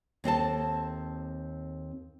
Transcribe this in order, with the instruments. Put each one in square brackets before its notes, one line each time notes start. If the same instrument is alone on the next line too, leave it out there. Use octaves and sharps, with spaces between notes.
[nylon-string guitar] D#2 C4 A4 A5